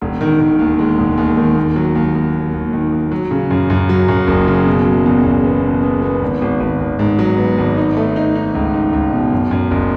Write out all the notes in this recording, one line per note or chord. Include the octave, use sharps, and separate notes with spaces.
E1
D#3
D#3
D#2
G#3
E1
D#2
D#3
D#2
F#3
D#2
D#2
D#2
D#2
D#3
D#2
F#3
C#3
F#2
F#2
F#3
F#2
F#1
C#3
B2
F#3
E2
E2
B3
B2
B3
B3
G#1
G#1
G#1
G#1
G#2
F#3
B3
G#1
D#4
A3
D#4
D#4
C#2
D#4
C#2
B2
F#2
F#2
F#1